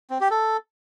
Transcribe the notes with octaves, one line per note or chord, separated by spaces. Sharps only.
C4
G4
A4